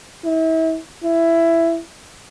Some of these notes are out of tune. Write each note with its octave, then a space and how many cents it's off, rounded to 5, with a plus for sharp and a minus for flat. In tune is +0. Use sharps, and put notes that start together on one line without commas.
E4 -35
E4 +10